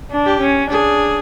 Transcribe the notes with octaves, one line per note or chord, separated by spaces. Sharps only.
D4
G4
C#4
D4 G#4